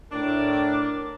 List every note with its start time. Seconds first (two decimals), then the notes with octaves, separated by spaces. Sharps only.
0.12 A2 D4 A#4 D6